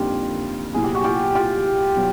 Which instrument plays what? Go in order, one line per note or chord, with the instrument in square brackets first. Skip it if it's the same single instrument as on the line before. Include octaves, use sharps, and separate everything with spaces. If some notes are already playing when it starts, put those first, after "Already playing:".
Already playing: [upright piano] F2 D3 G3 A#3 D#4 [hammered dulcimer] F4 G4
[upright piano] C2 A#2 F#3 B3 E4 [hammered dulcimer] G#4
[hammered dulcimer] G4
F#4
F4 G4
F4 G4
[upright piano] B2 F#3 B3